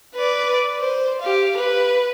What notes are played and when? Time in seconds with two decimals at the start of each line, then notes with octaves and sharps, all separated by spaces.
0.15 B4 D5
0.80 C5
1.21 G4 F5
1.57 B4